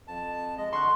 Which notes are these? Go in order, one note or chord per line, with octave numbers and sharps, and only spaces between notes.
F2 A5
G#3 D#5
D3 C6 C#6 F#6